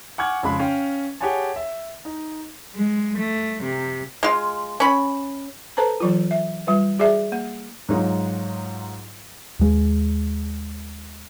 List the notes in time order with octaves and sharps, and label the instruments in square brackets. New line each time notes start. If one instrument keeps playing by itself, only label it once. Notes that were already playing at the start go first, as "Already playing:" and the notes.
[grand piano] F#5 G#5 C#6 D6 F6 G#6
F2 C#3 G#3 B5
C#4 F5 G5
G4 G#4 C#5 F#5 G#5 A5
E5
D#4
[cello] G#3
A3
C3
[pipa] G#3 F4
C#4 B5
[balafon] A4 B4 C5 A5 A#5
E3 F#3 F4
E5
G3 F4 B4
F#4 G#4 D5 E5
A#3
[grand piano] G#2 F#3 D#4 F4
[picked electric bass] D#2 G#3